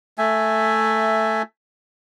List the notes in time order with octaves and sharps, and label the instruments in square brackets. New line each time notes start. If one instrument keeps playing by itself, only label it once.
[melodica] A3 E5 G#5